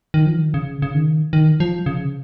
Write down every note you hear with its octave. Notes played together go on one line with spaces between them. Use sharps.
D#3
F3
D#3
C#3
C#3
D#3
D#3
F3
C#3